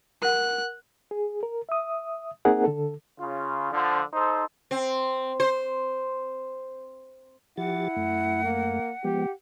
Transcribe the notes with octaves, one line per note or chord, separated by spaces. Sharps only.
A#4 F#5 F#6
G#4
A#4
E5 D#6
A#3 C4 D#4 G#4 A#4 F#5
D3 A4
C#3 F4
D3 F3
D#4 A4 C5
C4
C5
F3 E4 G4 F#5 A6
F#2 A3
A#3
F3 G#3 B3 G4